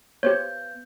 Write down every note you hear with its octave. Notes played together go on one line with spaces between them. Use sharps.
B3 G4 C5 C#5 G6